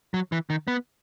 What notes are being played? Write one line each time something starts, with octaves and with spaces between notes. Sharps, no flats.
F#3
E3
D#3
B3